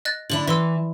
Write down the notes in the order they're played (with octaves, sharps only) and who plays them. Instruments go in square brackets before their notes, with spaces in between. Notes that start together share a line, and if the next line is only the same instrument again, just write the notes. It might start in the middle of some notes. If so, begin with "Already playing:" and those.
[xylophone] D#5 F#6 A6
[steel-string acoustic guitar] D3 D4 E4 [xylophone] F#7
[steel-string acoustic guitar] E3 [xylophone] B4 C6 E6